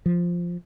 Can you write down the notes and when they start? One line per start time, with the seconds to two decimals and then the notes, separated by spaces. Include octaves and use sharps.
0.06 F3